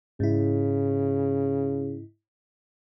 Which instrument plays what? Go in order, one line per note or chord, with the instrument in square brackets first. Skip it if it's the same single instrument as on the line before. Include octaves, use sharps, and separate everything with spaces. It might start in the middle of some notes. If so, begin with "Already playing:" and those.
[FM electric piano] G#2 E4 [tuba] C#3